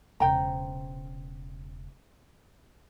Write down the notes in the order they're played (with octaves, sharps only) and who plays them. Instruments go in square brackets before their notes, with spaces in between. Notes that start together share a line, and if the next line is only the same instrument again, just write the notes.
[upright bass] E1 C#3 [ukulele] C5 G5 A#5